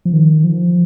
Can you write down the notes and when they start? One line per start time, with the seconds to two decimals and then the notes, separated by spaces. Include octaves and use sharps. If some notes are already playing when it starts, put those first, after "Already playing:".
0.05 F3
0.13 D#3
0.44 F3